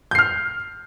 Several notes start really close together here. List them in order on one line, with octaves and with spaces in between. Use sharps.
G6 C7 F6